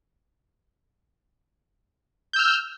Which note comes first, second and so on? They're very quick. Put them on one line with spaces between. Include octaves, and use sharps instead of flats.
G6 E6 F6